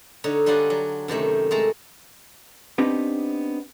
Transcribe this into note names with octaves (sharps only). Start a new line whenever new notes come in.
D3 D#4 C#5
G3 D4 F4 F#4 F#5 G#5
F#3
F#2 C3 D#3 A3
G#3 A3 A5 A#5
B3 C4 D4 D#4 G4 B4